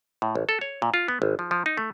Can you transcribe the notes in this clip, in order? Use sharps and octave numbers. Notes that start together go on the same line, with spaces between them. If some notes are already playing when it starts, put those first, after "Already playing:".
A2
A1
A4
C#5
A#2
F4
B3
G#1
F3
F3
D#4
A3